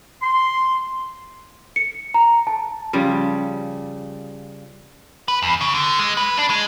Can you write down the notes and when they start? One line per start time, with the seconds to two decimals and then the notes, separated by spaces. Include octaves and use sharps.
0.22 C6
1.76 C#7
2.14 A#5
2.47 A5
2.93 C#3 F3 G3
5.28 B4
5.42 E2
5.61 C#3
5.74 D3
5.99 G#3
6.17 B4
6.37 D4
6.50 G#3